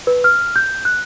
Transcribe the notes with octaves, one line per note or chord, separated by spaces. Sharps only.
B4
F6
G6
F#6